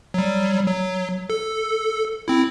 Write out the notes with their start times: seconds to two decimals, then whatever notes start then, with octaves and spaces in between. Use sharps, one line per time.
0.14 F#3 G3
0.66 F#3
1.30 A4
2.28 C4 E4